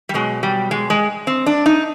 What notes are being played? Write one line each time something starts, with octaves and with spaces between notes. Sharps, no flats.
G3
B2 F#3 G#3
G3
G#3
G#3
C4
D4
D#4